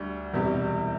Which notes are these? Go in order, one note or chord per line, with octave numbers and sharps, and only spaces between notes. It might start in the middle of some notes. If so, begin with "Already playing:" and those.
Already playing: D2 D3 G3
E1 E2 C3 G3